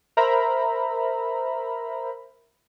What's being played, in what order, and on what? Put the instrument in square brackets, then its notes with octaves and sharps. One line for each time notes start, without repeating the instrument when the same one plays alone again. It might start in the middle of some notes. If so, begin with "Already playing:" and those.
[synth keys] A#4 C5 E5 A#5 B5